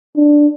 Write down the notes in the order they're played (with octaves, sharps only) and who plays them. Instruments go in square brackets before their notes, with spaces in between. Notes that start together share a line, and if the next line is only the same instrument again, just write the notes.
[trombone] D4